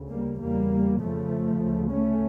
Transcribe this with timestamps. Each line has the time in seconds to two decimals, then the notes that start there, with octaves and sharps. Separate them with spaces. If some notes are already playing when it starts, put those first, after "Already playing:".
Already playing: D2 C#3
0.10 G3 A#3
0.40 E2 C#3 G3 A#3
1.00 F2 C#3 F3 A3
1.61 D2 C#3
1.91 A3 C#4